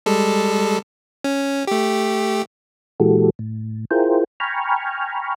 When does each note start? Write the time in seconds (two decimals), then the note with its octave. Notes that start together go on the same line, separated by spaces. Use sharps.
0.06 G3 G#3 A4
1.24 C#4
1.67 A3 G4
3.00 A#2 E3 G#3 F#4 G4 A4
3.39 A2
3.91 E4 F4 G#4 A#4 C5 G5
4.40 G5 G#5 A#5 B5 C#6 F6